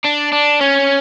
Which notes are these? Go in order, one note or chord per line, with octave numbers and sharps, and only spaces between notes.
D4
D4
C#4